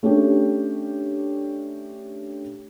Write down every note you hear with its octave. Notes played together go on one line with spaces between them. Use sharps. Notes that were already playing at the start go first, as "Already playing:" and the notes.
A3 C#4 D4 G4